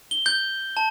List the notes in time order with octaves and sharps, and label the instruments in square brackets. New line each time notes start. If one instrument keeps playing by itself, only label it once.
[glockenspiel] G7
G6
A5